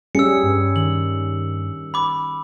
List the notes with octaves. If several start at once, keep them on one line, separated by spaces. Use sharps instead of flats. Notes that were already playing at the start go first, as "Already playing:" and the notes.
G3 C#4 G#4 E6 C#7
G2
D#3 F#7
B5 D6